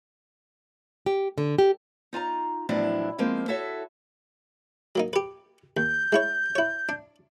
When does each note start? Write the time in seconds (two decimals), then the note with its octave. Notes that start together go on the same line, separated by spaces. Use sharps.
1.06 G4
1.38 D3
1.58 G4
2.13 D#4 F4 A5 A#5
2.69 E2 A2 F3 F#3 D4 E4
3.18 F3 G#3 A#3 C4
3.48 E4 F#4 A4 C#5 E5
4.95 F#3 A#3 D#4
5.13 G4 B4
5.77 D#2 G6
6.12 G#3 E4 C#5
6.55 E4 C#5
6.89 D4